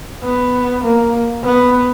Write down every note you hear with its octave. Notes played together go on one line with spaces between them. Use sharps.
B3
A#3
B3